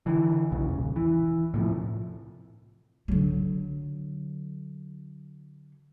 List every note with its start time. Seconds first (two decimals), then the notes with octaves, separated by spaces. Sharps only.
0.06 D3 E3
0.51 B1 E2 C#3
0.69 D#1
0.96 E3
1.54 A2 C3 F3
3.08 D3 F#3